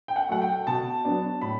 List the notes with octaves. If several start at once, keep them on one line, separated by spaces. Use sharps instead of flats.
G5
F#5
F#3 A3 F#5
G5
B2 A5
F#3 B3 D4
A2 B5